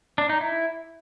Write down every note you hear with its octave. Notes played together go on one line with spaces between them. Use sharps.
D4
D#4
E4